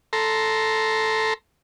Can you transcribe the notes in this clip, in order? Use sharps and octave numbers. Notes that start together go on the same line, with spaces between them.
A4 A#5 C6